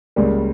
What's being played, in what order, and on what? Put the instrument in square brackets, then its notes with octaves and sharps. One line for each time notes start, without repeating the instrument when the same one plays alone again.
[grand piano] C#2 C#3 G3 A#3